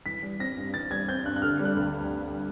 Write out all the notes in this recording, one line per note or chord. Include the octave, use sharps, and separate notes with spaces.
E3 B6
G3
C4 A#6
G2
E3 A6
G3 G#6
C4 G6
G2 F#6
F#6
D3 F6
G3
F#6
D2